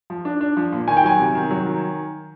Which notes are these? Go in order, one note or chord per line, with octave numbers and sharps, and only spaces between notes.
F3
D4
D4
F3
A#2
D#3 G#5
G5
F#3 G#5
C3
D#3
F#3
D#3